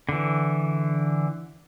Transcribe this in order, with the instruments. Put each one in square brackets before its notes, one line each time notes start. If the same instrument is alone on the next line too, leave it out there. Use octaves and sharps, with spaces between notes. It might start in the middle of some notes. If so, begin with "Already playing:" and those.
[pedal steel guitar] D3 E3